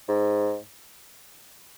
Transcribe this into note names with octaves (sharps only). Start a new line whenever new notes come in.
G#2